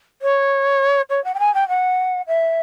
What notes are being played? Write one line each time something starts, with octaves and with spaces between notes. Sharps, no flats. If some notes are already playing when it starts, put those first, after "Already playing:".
C#5
C#5
F#5
G5
G#5
G5
F#5
E5